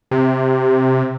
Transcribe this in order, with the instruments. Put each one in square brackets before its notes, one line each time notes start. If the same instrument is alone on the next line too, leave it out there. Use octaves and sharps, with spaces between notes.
[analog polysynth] C3